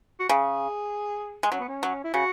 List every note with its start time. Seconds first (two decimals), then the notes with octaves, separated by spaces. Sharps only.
0.19 F#4
0.29 C#3 G#4
1.43 G#3
1.52 F#3 C#4
1.60 B3
1.68 C#4
1.83 F#3
2.04 E4
2.14 C#3 F#4